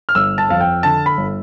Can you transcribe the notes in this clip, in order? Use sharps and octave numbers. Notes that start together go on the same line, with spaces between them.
F6
G1 E6
A5
F2 F5
G5
D3 A5
B5
G1